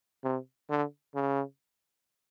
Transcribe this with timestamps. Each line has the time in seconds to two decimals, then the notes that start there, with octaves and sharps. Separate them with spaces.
0.24 C3
0.70 D3
1.15 C#3